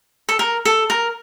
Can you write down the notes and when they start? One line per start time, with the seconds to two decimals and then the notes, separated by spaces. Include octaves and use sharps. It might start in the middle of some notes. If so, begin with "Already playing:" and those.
0.29 A4
0.39 A#4
0.65 A4
0.90 A#4